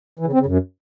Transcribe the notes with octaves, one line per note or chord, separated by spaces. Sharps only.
E3
C#3
C4
C#3
F#2